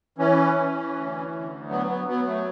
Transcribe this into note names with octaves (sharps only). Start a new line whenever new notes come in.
E3 C#4
E3
D2
D2
F#3 B3
B3
F#3 B3
A3